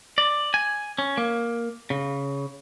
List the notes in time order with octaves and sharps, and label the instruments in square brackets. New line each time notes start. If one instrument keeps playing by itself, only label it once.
[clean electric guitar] D5
G#5
C#4
A#3
C#3